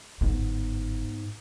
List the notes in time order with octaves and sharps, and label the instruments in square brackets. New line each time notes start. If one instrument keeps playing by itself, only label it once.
[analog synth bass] G1 [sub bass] G#2 [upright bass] B3